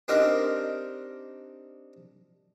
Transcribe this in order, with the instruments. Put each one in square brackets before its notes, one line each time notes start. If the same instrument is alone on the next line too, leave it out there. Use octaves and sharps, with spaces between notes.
[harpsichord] C4 D4 D#4 G4 A#4